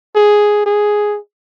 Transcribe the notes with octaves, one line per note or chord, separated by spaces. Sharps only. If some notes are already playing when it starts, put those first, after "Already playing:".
G#4
G#4